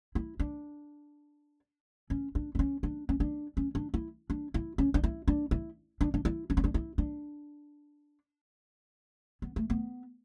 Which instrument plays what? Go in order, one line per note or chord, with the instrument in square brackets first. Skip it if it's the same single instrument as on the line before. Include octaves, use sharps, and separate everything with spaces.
[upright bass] E4
D4
C#4
D4
D4
C#4
D4
C#4
D4
C#4
D4
E4
D4
E4
C#4
D4
E4
D4
E4
D4
D4
E4
D4
C#4
D4
E4
D4
B3
A3
B3